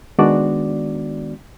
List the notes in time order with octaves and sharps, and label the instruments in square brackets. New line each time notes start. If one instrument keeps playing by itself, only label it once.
[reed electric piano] D#3 G#3 B3 D4 F#4 D5